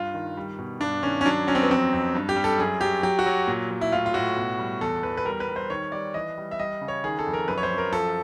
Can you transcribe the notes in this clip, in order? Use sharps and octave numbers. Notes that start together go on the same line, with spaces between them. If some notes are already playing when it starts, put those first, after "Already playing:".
Already playing: G2 F4
D#3
G3
B2
G2 D4
D#3 C#4
C#4
F#3 D4
F#3 C#4
C4
B3
F2 C4
F2
G2
G4
G3
A4
F#2 G#4
F#3 G4
F#3 G4
F#4
F#3
A#2
F#3
E4
A2 F4
F4
A2 F#4
B2
G3
E2 A4
E2 B4
B4
G3 A#4
B4
G3
C5
D#3 C#5
G3 D5
E3 D#5
G3
E5
G3 D#5
C#3
C#5
D#3 G#4
A4
F2
A#4
F#2 B4
C#5
C5
F#2
A#4
F3 A4